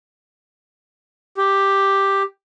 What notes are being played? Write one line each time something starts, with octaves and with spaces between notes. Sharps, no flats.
G4